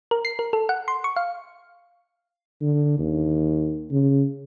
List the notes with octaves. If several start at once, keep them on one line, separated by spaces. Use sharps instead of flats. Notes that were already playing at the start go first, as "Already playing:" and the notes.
A#4
C7
A#4
A4
F#5
C6
C#6
F5
D3
D#2
C#3